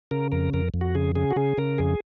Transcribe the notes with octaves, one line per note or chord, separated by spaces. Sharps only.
C#3 A#4
F2 A#4
F2 A#4
F2
F#4
C#3 G#4
C#3 G#4
F#4
C#3 G#4
C#3 A#4
F2 G#4